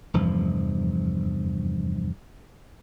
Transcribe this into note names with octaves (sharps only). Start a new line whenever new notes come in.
F1 E2 G2 F3